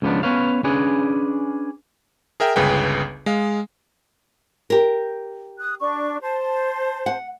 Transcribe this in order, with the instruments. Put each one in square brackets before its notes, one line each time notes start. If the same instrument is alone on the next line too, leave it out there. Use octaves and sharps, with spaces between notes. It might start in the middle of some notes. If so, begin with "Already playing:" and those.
[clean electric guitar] C#2 C#3 F3 B3 D4
B3 C#4 B4 C#5 F5
C#4 D4 G#4 B4
[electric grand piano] G#4 A#4 E5 G5
G1 C#2 C#3 G#4 B4 G5
G#3 F5
[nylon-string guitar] G4 A#4
[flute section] D#6 F#6
D4 C#6
C5 A5
[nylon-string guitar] F#5